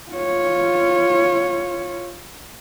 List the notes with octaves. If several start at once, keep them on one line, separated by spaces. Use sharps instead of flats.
F4 C#5